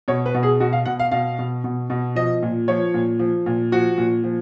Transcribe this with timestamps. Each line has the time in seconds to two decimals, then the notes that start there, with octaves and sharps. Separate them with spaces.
0.08 B2 C#5
0.26 B4
0.34 B2
0.43 G#4
0.60 B2 F#4
0.73 F5
0.85 B2 F#5
1.00 F5
1.11 B2 F5
1.39 B2
1.64 B2
1.90 B2
2.15 F3 D#5
2.43 A#2
2.68 F3 C#5
2.94 A#2
3.19 F3
3.46 A#2
3.72 F3 F#4
3.98 A#2
4.24 F3